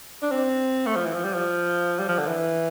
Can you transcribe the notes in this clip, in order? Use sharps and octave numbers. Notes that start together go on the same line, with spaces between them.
D4
C4
A3
F3
E3
F3
G3
F3
G3
F3
D3
E3